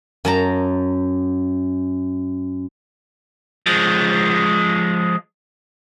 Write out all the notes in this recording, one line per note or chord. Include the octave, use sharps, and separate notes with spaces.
F#2 A5 A#5
F3 G#3